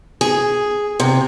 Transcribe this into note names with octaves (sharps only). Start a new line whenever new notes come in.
G#4
C3